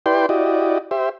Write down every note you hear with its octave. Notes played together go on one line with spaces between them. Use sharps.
E4 G4 B4 D5 G5 C6
E4 F#4 G4 D5 D#5
G4 C5 E5